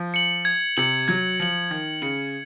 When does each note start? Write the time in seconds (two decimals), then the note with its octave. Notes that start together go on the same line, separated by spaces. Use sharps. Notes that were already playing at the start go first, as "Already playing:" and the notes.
Already playing: F3
0.14 C#7 F#7
0.45 G#6
0.77 C3 C#7 F#7
1.08 F#3 G#6
1.40 F3 C#7 F#7
1.71 D#3 G#6
2.02 C#3 C#7 F#7